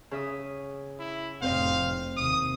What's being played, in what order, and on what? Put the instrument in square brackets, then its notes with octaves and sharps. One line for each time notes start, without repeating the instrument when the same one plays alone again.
[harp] C#3 E5 D#6
[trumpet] E4
[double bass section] F1 F2 A2 [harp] C4 C5 D#5 [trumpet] F5
[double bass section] D#2 C3 [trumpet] D#6